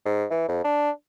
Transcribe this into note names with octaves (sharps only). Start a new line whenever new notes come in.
G#2
E3
F2
D4